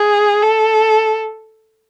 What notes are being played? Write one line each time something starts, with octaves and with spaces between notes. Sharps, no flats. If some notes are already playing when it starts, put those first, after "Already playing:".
Already playing: G#4
A4